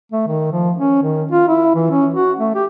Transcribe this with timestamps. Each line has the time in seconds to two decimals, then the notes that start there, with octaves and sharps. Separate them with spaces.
0.12 A3
0.27 D#3
0.52 F3
0.76 C#4
1.03 D#3
1.31 F4
1.48 E4
1.75 E3
1.90 C#4
2.14 F#4
2.39 A3
2.55 G4